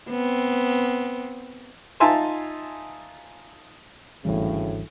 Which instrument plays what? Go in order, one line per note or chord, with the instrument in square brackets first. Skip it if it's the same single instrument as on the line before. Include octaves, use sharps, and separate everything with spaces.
[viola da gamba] B3 C4
[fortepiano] D#4 F4 E5 G#5 A5 C6
[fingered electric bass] G#1 E3 G3 [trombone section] D2 A2 C#3